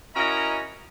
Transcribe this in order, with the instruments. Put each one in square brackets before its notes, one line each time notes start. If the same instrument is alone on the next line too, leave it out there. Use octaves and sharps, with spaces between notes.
[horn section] C#4 E4 F#4 A#4 D#5 A#5